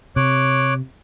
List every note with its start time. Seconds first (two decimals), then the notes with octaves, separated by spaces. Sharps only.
0.16 C3 C#5 D6 F#6